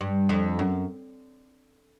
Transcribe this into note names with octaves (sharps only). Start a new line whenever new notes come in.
G2
F2
F#2